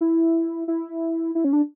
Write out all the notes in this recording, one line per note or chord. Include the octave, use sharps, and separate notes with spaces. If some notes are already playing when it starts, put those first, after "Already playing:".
E4
E4
E4
C#4
D4